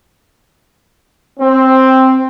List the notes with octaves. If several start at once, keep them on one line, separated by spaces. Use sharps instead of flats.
C4